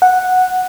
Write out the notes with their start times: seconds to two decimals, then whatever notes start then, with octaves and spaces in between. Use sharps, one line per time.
0.02 F#5